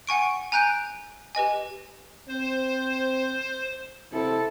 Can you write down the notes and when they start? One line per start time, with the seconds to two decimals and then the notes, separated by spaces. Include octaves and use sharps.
0.07 F#5 G#5 C#6 D7
0.52 G#5 A#5 F#6 G6 D7
1.35 G4 B4 D#5 G#5
2.28 C4 C5
4.12 C3 E4 A4